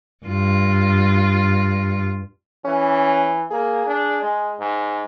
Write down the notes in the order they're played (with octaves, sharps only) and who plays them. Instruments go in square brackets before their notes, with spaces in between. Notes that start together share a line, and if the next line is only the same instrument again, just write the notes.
[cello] G2 F4
[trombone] E3 [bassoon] C#4
[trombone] A#3 [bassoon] G#4
[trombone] D4
G#3
G#2